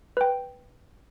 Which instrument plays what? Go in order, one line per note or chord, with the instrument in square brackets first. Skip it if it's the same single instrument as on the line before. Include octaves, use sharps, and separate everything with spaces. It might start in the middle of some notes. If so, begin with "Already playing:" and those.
[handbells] B4 G5